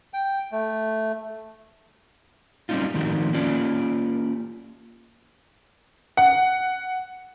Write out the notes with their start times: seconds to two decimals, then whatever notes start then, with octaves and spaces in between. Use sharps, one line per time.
0.14 G5
0.52 A3
2.69 F#3 G3 C4 C#4 D#4 F4
2.94 A2 D#3 F3 C4 D#4 F#4
3.33 A#3 C#4 F4 D5
6.17 F#5